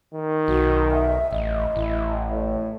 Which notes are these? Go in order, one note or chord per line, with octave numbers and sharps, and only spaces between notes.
D#3
B1 F#4
E5
A1 D#5
A1 E4
A2 C#5